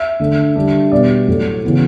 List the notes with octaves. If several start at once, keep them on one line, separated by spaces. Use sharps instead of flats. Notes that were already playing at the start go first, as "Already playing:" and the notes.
Already playing: E5
D3 A3 D4
D3 G3 D4
B2 G3 B3 D5
A2 F#3 A3
C#3 E3 B3